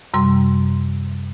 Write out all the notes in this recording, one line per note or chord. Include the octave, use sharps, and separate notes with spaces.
F#2 C3 G3 C6